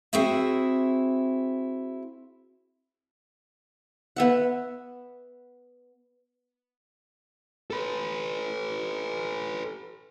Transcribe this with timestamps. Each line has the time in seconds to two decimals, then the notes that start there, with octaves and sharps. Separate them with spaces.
0.13 C4 E4 F#4 G#4 E5
4.16 B3 E5 F#5
7.71 A4 B4